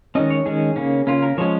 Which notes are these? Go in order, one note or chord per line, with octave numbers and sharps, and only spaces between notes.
D#3 G#3 C#4 D#5
C#5
D#3 G#3 C#4 G#4
C#3 A#3 C#4
C#3 A#3 C#4 F4
A#4
F3 G#3 C#4 C#5